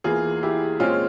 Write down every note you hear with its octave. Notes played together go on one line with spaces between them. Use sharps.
E2 E3 A#3 F4 G#4
E4 G4
A#2 G#3 C4 C#4 F4